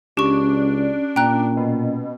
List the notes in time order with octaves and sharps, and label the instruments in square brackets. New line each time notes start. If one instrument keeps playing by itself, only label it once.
[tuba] C#2 [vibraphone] C#4 [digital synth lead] D4 [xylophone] G4 C#6
[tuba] A#2 [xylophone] G5 A#5 F#6
[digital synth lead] B2